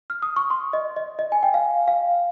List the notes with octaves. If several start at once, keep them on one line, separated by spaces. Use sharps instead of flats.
F6
D#6
C#6
C6
D#5
D#5
D#5
G#5
G5
F5
F5